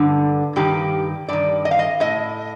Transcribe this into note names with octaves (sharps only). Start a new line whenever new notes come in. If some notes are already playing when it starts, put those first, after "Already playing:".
Already playing: G2 D3
G2 D#3 G4
G2 D#3 D5
D#5
F5
D#5
A2 D#5